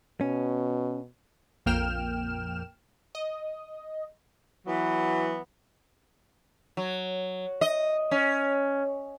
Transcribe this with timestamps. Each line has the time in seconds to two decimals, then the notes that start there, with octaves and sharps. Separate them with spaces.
0.21 B2 C#4
1.66 A#1 F2 A#3 G5 F6 E7
3.15 D#5
4.66 E3 F#3 B3
6.77 F#3
7.61 D#5
8.11 C#4